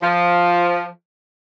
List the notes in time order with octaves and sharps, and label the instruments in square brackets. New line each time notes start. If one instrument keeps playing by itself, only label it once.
[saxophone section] F3